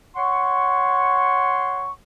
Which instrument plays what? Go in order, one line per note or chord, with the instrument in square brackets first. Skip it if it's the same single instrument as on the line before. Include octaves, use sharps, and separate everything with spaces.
[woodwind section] C#5 F#5 C6 C#6